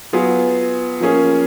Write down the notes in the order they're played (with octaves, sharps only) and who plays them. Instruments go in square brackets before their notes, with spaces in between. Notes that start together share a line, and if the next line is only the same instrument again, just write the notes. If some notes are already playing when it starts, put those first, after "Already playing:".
[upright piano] F#3 B3 F4 G#4
F3 A#3 C#4 G#4